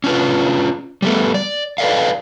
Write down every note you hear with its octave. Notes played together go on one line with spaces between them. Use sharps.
C#4 D4 F4 B4
G3 A3 B3
D5
A4 B4 D5 D#5 F5